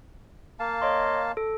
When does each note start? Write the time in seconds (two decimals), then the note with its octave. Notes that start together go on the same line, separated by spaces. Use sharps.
0.60 A#3 F5 A5
0.82 C#5 D#5 C6
1.37 A4